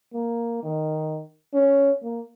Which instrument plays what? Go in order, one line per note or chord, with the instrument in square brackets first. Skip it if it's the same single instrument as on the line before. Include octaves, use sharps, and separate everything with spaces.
[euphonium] A#3
D#3
C#4
A#3